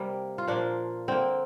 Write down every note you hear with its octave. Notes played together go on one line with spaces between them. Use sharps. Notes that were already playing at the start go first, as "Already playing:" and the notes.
Already playing: C3 G3 A#3
F4
A#2 F3 A#3 D4
D3 A#3 C4